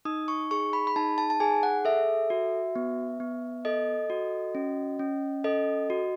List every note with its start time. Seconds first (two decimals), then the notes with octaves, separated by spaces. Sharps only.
0.05 D#4 D#6
0.28 C#6
0.51 G#4 C#6
0.73 B5
0.87 B5
0.96 D#4 A5
1.18 A5
1.30 A5
1.40 G#4 G#5
1.63 F#5
1.85 A4 E5
2.30 F#4
2.75 B3
3.20 B3
3.65 A4 D#5
4.10 F#4
4.55 C#4
4.99 C#4
5.44 A4 D#5
5.90 F#4